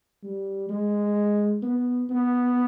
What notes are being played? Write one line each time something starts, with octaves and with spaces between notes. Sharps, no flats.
G3
G#3
B3
B3